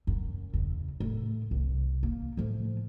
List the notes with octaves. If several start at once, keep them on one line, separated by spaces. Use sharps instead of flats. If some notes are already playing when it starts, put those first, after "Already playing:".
F#2
E2 C#3
A2
C2
A#3
A2 F3